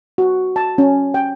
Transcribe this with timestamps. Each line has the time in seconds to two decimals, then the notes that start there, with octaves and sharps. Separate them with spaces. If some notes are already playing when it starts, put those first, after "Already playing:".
0.18 F#4
0.56 A5
0.78 C#4
1.14 G5